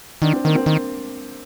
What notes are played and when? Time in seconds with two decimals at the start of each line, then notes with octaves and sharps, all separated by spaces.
0.22 D#3 D4
0.33 C4
0.44 D#3 A#3
0.55 C4
0.66 D#3